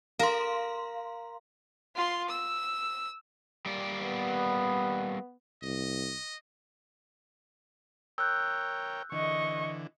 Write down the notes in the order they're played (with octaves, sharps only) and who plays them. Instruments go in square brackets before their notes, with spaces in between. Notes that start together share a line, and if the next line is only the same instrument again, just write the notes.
[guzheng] A#4 [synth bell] F5 C6
[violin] F4 C6
E6
[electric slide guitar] G3 A#3 D5
[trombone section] B3
[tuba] C2 [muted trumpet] D#5
[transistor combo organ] A#4 C#5 G5 [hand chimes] E6 F#6 G6
[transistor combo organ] D3 E3 [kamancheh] D#5 C#6